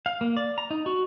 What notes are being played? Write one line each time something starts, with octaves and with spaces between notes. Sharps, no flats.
F5
A#3
D5
A#5
D#4
F#4